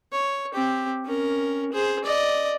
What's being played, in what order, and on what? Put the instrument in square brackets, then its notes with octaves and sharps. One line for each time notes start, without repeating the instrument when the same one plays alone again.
[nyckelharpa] C#5
C4 G4
C#4 A#4
G#4 C5
D5 D#5